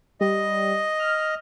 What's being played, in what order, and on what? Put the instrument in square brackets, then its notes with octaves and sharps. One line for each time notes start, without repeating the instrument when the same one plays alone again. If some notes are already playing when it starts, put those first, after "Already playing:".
[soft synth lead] G3 [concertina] D#5
[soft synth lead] F6